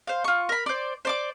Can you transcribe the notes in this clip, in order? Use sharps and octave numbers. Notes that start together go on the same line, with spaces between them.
C5 F5
F4 C#6
A#4 B5
C5 D5
C5 D5 D6